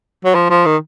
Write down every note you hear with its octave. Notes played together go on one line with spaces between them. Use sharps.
F#3
F3
F3
D#3